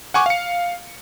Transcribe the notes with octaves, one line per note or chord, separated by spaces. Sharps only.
F#5 G#5 C#6 D6
F5 C#7